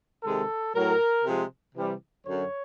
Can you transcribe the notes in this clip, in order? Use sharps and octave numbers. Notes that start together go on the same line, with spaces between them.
C3 D#3 G#3 A4
A2 F#3 A#4
C3 F3 G#3
C3 E3 G3
F#2 D3 F#3 C#5